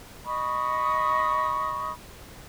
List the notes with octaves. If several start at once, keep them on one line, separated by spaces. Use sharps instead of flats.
D#5 B5 C#6 D#6